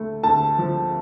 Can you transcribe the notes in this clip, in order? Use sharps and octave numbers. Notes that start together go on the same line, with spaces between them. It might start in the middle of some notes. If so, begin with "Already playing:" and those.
Already playing: D2 A3
D2 A5
F3